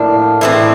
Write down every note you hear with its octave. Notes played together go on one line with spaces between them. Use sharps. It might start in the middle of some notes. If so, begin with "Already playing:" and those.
Already playing: A2 F3 A#3 D4
A2 E3 A3 C4